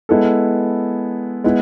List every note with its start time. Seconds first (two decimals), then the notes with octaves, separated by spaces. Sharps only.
0.09 G#3 B3 E4 A4
1.44 G#3 B3 E4